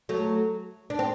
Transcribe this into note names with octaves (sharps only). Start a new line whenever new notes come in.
F#3 A3
D4
C4